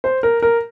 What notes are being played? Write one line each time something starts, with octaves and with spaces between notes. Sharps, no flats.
C5
A#4
A#4